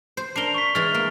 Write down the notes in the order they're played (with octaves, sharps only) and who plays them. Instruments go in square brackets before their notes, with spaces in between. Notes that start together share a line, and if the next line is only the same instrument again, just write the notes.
[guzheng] C5
[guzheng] D4 A#4 [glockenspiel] C7 F7 G7
[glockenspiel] C#6 B6
[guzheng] E3 G#3 [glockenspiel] F6 A6 F7
[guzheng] A#3